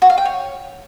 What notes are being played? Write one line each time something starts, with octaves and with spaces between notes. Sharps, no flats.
F#4
F5
G5
C#5